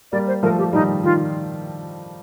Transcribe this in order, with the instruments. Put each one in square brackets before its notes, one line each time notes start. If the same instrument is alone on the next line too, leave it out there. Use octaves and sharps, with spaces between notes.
[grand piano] G3 A#3 [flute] D5
[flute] C5
[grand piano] F3 A3 [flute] A#4
[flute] G4
[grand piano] D#3 G3 [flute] D#4
[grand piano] D#3 [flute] F4